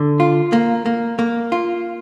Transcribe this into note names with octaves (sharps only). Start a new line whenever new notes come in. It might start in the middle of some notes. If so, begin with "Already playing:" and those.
Already playing: D3
F4
A#3
A#3
A#3
F4